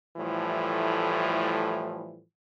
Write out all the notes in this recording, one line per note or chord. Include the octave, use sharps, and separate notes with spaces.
A2 E3 F3 G3 A3